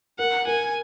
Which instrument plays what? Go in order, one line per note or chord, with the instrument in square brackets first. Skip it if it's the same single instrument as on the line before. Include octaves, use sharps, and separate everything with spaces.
[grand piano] A#4 [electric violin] F#5
[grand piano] A#4 [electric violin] G#5